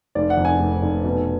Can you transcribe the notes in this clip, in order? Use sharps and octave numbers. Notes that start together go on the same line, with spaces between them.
F1 D5
F#5
F2
G#5
F1
F1
B2